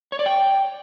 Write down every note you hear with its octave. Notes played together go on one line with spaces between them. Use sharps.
C#5
D5
G5